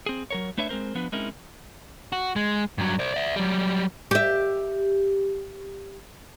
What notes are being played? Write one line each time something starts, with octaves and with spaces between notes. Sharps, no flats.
C4 G#4
F#3 A#4 C#5
A3 D4 B4 C#5 E5
G#3 C4 A#4 C5
F3 B3 D4 B4
G#3 C4 C#4 D#4 E4 A#4
F#4
G#3
G2 F#3
C5 D5
D5 E5
F#3 G3
G4 E5